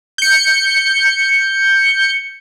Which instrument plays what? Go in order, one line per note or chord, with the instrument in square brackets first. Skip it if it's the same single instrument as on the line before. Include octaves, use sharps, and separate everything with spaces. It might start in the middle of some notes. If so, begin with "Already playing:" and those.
[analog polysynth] G6 C#7